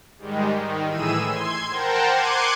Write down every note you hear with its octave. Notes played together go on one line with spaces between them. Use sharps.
G#2 D#3 G3 G#3
D#3
A2 E3 G#4 E6 D#7
C6 G#6
A#4 C5 F#5 G5 A5 A#5
C6 D6 F#6 G#6 C#7 D#7